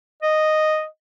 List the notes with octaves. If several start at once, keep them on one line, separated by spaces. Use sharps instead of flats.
D#5